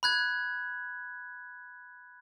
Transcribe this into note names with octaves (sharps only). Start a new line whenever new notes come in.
B5 F#6 G#6